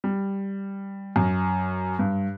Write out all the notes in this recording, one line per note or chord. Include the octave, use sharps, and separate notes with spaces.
G3
F#2
G2